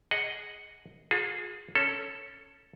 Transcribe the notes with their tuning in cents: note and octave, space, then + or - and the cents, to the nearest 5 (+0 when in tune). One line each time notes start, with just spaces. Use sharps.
G#4 +0 D#5 +0 F#5 +0
F4 +45 G#4 +0
C#4 +0 A4 +0